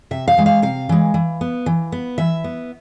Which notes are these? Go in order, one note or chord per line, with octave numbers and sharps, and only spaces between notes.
C3 E5
F5
E3 G#3
F5
C3 F5
E3 G#3
E3
B3
E3
B3
E3 E5
B3